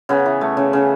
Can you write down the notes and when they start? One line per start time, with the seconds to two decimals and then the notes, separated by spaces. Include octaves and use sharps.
0.09 C#3 B3
0.26 E3
0.41 A3
0.57 C#3
0.73 C#3